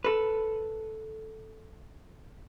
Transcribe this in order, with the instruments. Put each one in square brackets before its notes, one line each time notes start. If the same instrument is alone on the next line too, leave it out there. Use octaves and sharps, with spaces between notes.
[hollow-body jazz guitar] A4 B4